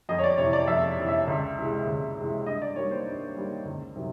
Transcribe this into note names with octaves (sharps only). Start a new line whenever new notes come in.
F2 D#5
C#5
D5
C3 E3 C#5
D5
F2 E5
C3 E3
E5
C#2
C3 E3 G#3
C#2
C3 E3 G#3
G2 D#5
D5
D#3 G3 A#3 C#5
C5
G2
D#3 G3 A#3
C#2
C3 D#3 F#3